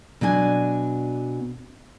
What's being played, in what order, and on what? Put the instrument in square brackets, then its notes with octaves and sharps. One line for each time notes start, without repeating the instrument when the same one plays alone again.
[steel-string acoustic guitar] B2 F#3 D4 G#5